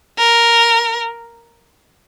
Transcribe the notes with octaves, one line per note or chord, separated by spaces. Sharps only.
A#4